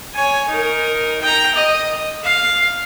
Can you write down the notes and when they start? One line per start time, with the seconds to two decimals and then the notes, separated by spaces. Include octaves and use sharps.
0.15 C#5 G#5
0.49 D#4 A#4
1.22 G5 A#5
1.55 D#5
2.24 F5